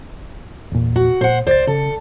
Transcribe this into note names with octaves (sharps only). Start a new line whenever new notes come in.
E2 A#2
F#4
A#2 C5 F#5
C#2 C5 D5 A6
C#3 A4